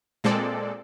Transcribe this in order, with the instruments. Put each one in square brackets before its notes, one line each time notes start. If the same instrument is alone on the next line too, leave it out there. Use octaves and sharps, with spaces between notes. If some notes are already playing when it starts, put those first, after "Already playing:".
[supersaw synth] A#2 G#3 C4 A4 D5